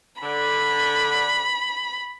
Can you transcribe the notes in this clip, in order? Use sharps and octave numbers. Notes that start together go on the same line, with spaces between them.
D3 B5